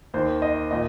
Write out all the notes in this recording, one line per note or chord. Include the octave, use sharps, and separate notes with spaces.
D#2 D#3 C5
D#5
A#2 D#5